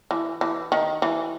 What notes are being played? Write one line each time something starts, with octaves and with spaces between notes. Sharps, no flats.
E3
E3
D#3
E3